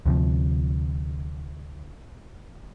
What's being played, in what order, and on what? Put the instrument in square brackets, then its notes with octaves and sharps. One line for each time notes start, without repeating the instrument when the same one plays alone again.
[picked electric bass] D2 C3 F3